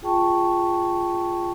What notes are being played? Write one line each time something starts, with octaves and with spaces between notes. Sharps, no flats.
F4 G#4 G5 A5 C#6